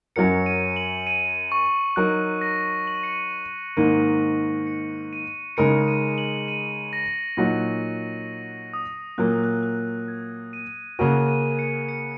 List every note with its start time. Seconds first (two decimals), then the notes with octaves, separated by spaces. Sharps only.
0.16 F#2 F#3 C#4 F#4 A#4 C#7
0.46 D#7
0.76 F#7
1.07 D#7
1.52 C#6
1.96 F#3 D#4 A#4 F#6
2.41 A#6
2.87 F#7
2.95 D#7
3.03 C#7
3.12 D#7
3.77 G#2 D#3 A#3 D#7
4.67 C#7
5.13 D#7
5.57 C#3 G#3 D#4 A#4 C#7
5.88 D#7
6.18 F#7
6.48 D#7
6.93 A#6
7.37 A#2 F#3 D#4 F#4
8.74 D#6
9.18 A#2 F#3 A#3 F#6
9.31 D#6
9.43 F#6
9.63 F#6
10.08 G#6
10.53 D#7
10.99 C#3 A#3 F#4 A#4 D#7
11.28 D#7
11.59 C#7
11.89 C#7